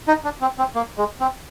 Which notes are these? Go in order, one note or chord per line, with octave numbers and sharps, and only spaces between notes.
D#4
D4
C4
C4
A#3
G#3
C4